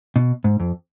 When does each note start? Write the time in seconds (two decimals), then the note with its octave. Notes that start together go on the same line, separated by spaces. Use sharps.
0.16 B2
0.44 G#2
0.60 F2